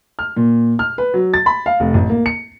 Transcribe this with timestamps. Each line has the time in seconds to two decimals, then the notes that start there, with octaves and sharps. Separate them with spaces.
0.19 F6
0.36 A#2
0.79 F6
0.98 B4
1.14 F#3
1.34 A6
1.46 B5
1.66 F5
1.80 F1
1.94 A1
2.10 A#3
2.26 C#7